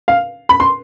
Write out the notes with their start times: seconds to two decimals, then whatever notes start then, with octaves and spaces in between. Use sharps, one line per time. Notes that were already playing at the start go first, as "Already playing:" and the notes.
0.08 F5
0.49 B5
0.60 C6